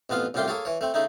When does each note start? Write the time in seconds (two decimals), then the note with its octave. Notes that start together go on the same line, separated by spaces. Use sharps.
0.10 A1 F2 B3 F4 F5
0.34 C2 F#2 A2 F4 G4 C6
0.48 A#3 G#4 A4 C#5
0.65 E3 C#5
0.81 A3 C4
0.94 C#3 A3 D#4 E4